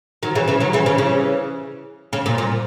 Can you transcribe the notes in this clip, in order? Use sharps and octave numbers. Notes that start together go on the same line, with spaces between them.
D#3 F#3
C#3 E3
C#3 E3
D#3 F#3
C#3 E3
C#3 E3
C#3 E3
C#3
A#2
A#2